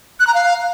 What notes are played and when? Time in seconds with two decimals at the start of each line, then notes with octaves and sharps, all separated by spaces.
0.20 F#6
0.27 A#5
0.34 F5